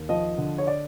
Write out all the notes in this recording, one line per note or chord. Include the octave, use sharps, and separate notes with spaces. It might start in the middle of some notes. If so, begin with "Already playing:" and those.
Already playing: D#2
F3 D#5
D3
C#5
D5